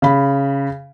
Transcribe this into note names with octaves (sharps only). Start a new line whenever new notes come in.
C#3 B5